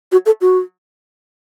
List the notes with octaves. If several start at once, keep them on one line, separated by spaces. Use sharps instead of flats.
F#4
A4
F#4